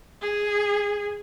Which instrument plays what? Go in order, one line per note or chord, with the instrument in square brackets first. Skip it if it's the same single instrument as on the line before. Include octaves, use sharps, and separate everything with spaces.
[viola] G#4